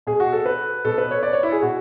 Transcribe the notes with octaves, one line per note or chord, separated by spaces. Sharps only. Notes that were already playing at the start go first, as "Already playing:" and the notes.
B2 G#4
F#4
A4
B4
B2 A4
B4
C#5
D5
C#5
E4
G#4
B2 F#4